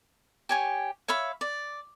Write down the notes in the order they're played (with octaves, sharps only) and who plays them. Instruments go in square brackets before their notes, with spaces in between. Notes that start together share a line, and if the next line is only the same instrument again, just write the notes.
[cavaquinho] G4 C#5 G#5
C#5 E5 F5 B5
D5